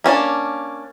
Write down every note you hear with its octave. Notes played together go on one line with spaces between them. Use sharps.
A#3 C#4 D4